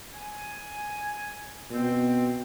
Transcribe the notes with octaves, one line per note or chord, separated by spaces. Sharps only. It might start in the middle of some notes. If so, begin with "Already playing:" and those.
G#5
B2 C4